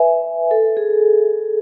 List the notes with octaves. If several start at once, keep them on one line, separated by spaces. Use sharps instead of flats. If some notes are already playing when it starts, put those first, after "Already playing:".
Already playing: B4 E5 G#5
A4
G#4